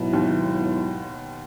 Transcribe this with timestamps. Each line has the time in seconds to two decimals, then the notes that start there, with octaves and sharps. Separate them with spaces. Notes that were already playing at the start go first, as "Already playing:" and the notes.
Already playing: G#2 B2 F#3 B3 E4
0.13 D#2 D#3